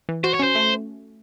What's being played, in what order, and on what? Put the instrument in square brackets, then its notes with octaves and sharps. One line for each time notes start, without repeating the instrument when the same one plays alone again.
[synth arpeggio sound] E3
[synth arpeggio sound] F#4 [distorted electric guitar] C5
[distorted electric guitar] C#5
[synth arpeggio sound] C#4 [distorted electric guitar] C5
[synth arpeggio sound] A3